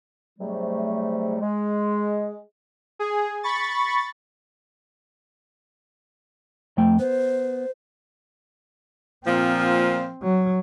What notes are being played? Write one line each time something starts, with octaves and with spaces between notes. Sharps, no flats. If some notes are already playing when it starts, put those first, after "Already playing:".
G#2 C3 F#3 G3 A3
G#3
G#4
B5 C#6 A6
F2 A3 G5
B3 C5
A#2 F3 C4
F#3